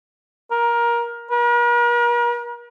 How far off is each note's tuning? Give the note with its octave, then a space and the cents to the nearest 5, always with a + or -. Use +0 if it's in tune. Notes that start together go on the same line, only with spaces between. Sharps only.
A#4 +20
A#4 +45